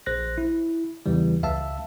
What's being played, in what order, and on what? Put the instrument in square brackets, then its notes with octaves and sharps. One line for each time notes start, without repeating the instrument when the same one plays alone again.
[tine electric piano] A#1 C5 F#6 A#6
E4
E2 C#3 E3 G3
C#2 E5 F5 A5 E6